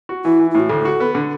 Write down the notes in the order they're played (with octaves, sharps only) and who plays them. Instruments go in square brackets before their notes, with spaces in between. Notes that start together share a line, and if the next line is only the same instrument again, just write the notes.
[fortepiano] F#4
[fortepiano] E3 [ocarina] E4
[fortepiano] E3
[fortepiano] A2 [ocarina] E4
[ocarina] F#4
[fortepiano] D2 [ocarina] A4
[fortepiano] F#4
B3
D3